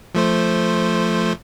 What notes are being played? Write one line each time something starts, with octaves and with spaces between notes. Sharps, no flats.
F3 A3 C5